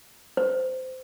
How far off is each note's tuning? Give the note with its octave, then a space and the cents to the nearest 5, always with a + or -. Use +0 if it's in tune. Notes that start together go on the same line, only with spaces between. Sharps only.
C5 -20